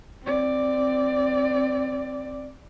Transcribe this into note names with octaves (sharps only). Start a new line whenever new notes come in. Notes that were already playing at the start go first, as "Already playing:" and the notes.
C4 D5